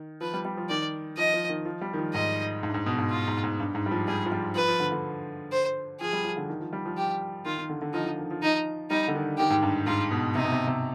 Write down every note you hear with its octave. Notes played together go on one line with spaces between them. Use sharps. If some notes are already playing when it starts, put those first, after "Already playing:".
Already playing: D#3
F3 B4
G3
G3
F3
D#3 D5
F3 D#5
F3
D#3
F3
G3
D#3
F3
G#2 D#5
G#2
G2
G#2
B2
G#2
F4
G#2
G#2
G2
G#2
G3
F3
G3 G#4
F3
G3
F3 B4
F3
D3
D3
C5
F3 G#4
G3
F3
D3
D#3
F3
G3
F3
G4
D#3 F4
D#3
D3
D3
F3 D#4
F3
D#3
F3
D#4
G3 D#4
D3
D#3
D#3 G4
G#2
G2
G#2 F4
B2
C3 D#4
B2
C3
C3